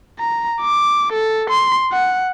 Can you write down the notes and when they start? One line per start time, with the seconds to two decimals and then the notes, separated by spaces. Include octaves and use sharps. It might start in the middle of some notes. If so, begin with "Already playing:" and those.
0.19 A#5
0.62 D6
1.13 A4
1.50 C6
1.92 F#5